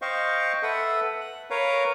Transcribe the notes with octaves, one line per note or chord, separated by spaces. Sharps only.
C5 D#5 F5 G5 C#6
A4 B4 E5 F#5
F#6
A#4 B4 C#5 F5 A#5